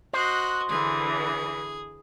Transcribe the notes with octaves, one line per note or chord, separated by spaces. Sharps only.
F#4 C5 D#5 F#6
D3 E3 G#4